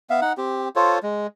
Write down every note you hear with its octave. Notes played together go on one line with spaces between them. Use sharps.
B3 E5 F5
D#4 F#5
C4 G4
F4 A4 C5 C#5
G#3